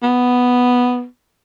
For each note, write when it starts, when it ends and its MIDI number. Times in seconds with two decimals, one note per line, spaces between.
0.03 1.04 59